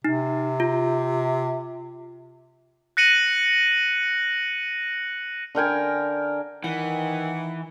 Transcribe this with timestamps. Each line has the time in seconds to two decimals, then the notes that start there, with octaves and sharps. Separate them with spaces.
0.05 C3 D#4
0.60 F4
2.97 F#6 A#6 C#7 D#7 F#7
5.55 D3 A#4 G5 G#5
6.64 D#3 E3 F#5